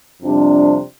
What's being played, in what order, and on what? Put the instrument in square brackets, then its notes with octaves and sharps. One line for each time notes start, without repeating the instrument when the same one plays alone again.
[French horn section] F2 C3 G3 D4